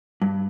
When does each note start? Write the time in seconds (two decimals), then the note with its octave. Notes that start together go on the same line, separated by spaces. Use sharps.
0.22 G2